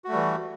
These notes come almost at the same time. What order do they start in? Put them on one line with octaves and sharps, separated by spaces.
F#4 A3 G3 E3